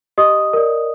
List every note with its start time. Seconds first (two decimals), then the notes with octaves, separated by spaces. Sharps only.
0.18 G4 D#5 D#6
0.53 A#4 D5